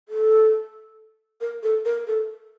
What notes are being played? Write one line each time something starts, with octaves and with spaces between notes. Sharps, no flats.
A4
A#4
A4
A#4
A4